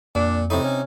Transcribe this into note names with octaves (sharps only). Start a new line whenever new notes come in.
F2 A#2 D4
A2 C3 D#4
C#4